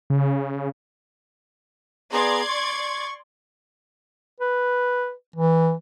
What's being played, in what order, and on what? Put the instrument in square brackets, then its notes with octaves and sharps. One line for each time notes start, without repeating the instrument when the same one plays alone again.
[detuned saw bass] C#3
[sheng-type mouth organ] B3 G#4 A#5 [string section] D5 C6 G#6
[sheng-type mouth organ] C#6
[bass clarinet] B4
E3